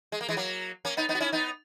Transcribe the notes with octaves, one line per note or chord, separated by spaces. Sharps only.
G#3
A#3
E3 G#3
F#3 A#3
A#3 C#4
B3 D#4
B3 D#4
F#4
C#4 E4
B3 D#4